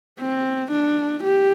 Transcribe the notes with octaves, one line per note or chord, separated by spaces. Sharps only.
C4
D4
G4